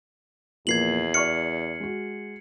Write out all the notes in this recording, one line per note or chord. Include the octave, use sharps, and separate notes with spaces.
E2 A#2 F3 A#3 G#6 C7 F#7
D5 C#6 F6 C#7
G#3 F#4